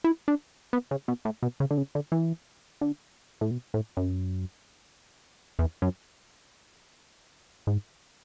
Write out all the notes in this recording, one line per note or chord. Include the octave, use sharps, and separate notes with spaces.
E4
D4
B3
C#3
B2
A2
B2
C#3
D3
C#3
D3
E3
D3
A2
B2
A2
F#2
E2
F#2
G#2